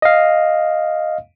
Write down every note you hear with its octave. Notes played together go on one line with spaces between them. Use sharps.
D#5 F5